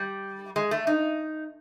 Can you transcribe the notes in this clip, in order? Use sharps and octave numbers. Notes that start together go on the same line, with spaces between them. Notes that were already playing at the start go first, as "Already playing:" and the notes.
Already playing: G3
G#3
A3
D#4